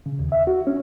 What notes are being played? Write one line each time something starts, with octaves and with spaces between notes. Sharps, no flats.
C#3
D#2
E5
F#4
C#4